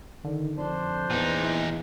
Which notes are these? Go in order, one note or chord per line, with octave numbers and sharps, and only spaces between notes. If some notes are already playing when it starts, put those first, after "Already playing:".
D3 D#3
F2 D4 C5
E2 A#2 B3 D#4
E4